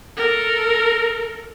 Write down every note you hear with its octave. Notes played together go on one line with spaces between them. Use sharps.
A4 A#4